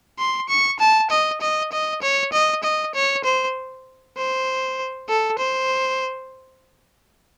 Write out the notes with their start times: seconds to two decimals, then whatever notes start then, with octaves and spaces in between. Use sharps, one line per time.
0.19 C6
0.49 C#6
0.79 A5
1.10 D#5
1.41 D#5
1.72 D#5
2.02 C#5
2.33 D#5
2.63 D#5
2.95 C#5
3.24 C5
4.17 C5
5.09 A4
5.39 C5